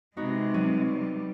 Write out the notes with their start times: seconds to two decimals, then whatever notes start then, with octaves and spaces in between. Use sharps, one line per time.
0.17 C3 G#3 B3 D#4 F#4
0.54 F#3 D#7
0.90 G3